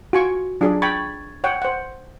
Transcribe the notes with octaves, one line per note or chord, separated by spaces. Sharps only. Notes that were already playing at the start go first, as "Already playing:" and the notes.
F4 F#4 G#5 C#6
F#3 D4 F4 G#4 D5
G5 B5 C#6 G#6 A6
C#5 F#5 G5
C5 F#5